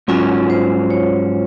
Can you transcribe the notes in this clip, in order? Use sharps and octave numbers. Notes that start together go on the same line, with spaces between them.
G#2 F#3 C#4 F4
C5
C#5